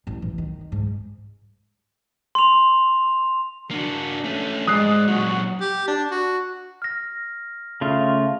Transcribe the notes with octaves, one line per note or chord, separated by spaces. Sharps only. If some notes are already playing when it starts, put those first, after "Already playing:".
A1
E3
D#3
G#2
C6 F7
A#3 D4 F#4
A3 C#4
F2 G#2 G#3 D5 D#6 F#6 C7
A#2 F#3 F#4
G4
D4
F#4
F6 A#6
C#3 A3 F4